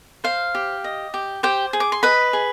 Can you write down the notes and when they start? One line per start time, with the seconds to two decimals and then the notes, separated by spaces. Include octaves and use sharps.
0.24 C5 F5
0.55 G4
0.84 D#5
1.14 G4
1.43 G4 C5 G5
1.73 G#4
1.80 D6
1.92 C6
2.03 B4 D#5 B5
2.33 G#4